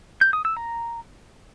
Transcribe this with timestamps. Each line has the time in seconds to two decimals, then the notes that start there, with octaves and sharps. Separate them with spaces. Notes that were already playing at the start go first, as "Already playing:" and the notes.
0.21 G6
0.33 D#6
0.45 E6
0.57 A#5